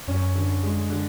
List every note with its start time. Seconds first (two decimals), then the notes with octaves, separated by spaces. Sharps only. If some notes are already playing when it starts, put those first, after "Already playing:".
0.08 F#2 C#4
0.35 D3
0.63 G#3
0.90 D3